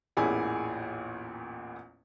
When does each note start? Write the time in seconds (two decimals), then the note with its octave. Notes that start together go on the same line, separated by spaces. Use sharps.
0.17 A1 E2 A#2 E4 G#4 G#5